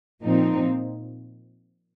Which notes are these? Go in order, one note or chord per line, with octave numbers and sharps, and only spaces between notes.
A#2 F3 C4 D#4